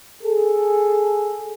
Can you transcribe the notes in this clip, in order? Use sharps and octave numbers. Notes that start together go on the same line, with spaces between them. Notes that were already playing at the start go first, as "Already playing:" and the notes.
G#4 A4